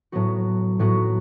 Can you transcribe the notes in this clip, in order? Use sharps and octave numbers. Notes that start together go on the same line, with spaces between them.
A2 F#3 B3 F#4
A2 F#3 B3 F#4